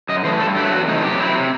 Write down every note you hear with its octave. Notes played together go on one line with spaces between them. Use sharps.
F#2 D#5
E3 A3 C5
G2 A4
F#3 A3 G4
E2 F#4
C3 E3 A3 D#4
F#2 G4
F#3 C4 E4
C3